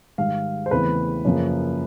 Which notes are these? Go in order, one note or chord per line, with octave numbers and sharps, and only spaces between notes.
G#2 D#3 G3 F5
C5
E2 C#3 E3 A3 C4 B4
F#2 C#3 F3 A#3